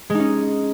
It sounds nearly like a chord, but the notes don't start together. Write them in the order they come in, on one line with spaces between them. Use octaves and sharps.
G#3 D#4 C#4